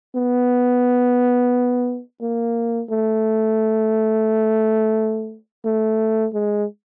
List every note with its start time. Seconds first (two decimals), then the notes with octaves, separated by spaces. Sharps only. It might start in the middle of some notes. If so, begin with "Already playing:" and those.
0.16 B3
2.22 A#3
2.90 A3
5.65 A3
6.34 G#3